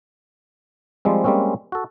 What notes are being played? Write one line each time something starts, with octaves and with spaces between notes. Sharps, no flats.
F3 G3 G#3 C4
G3 G#3 A#3 C4 C#4
F#4 A4